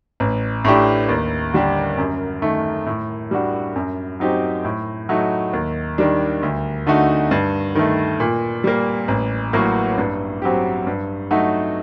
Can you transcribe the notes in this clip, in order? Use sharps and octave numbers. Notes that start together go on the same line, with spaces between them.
A1
A2 A3 D4 G4
D#2
D3 G3 D4 G4
F#2
D#3 A3
A2
G3 D4 F#4
F#2
F#3 C4 D#4 G4
A2
F#3 A3 D#4
D#2
D#3 G3 D4
D2
D3 A3 D#4 F#4
G2
D#3 A3
A#2
G3 A#3
A1
A2 F#3 A#3 F#4
G2
F#3 C4 G4
G2
F#3 A3 D#4 F#4